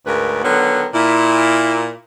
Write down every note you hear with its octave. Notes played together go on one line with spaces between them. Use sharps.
D2 G#2 A#4 B4
D3 D#3 F#3 B3
A#2 E4